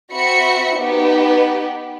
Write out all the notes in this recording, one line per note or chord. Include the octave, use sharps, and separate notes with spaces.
C4 F#4 E5 B5 C#7
B3 D#4 G4 B4